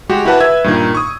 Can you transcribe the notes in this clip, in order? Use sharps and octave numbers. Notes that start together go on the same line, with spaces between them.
G#3 F#4 G4
E4 F#4 G4 B4 F#5 A5
B4 E5 E6 G#6
G2 A#2 D#3
C#6 D#6